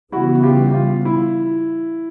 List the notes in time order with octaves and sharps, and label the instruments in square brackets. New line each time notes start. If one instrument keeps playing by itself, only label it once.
[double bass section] C#3 E3 G3 B3 [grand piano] E4 F#4
[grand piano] F4 G4
F4
E4